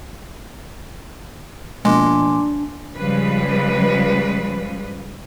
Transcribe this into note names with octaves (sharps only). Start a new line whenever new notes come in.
B2 F3 G#3 A#3 D4 G#5 C6 D6
C#3 F3 G3 G#3 B4